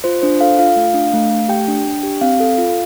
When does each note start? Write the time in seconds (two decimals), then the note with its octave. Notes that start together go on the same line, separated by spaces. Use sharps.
0.04 F4 C5
0.22 D4 C5
0.41 A4 F5
0.59 F4 F5
0.76 A3
0.94 D4
1.14 A3
1.31 A3
1.49 G4 G5
1.68 D4
1.86 D4
2.03 G4
2.21 C4 F5
2.40 A4
2.58 F4